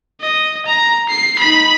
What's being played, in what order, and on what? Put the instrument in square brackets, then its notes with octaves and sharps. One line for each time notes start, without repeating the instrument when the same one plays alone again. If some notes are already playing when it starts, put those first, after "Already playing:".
[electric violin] D#5
A#5
C7
D#4 B5